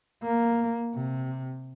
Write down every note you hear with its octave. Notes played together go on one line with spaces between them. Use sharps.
A#3
C3